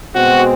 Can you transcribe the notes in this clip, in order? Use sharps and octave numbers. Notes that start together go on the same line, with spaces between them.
B2 G#3 C4 F#4